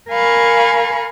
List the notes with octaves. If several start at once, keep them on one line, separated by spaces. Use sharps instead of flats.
A#4 F5 G#5 B5 C#6